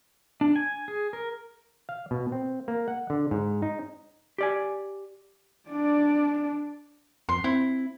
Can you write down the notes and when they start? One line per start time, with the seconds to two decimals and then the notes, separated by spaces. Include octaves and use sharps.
0.41 D4
0.56 G#5
0.88 G#4
1.13 A#4
1.89 F5
2.11 B2
2.32 C4
2.68 A#3
2.88 F#5
3.10 D3
3.31 G#2
3.62 D#4
4.38 G4 D5 G#5
5.70 D4 D5
7.29 F2 C6
7.44 C4 E4